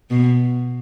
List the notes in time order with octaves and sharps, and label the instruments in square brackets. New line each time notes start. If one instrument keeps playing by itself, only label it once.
[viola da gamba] B2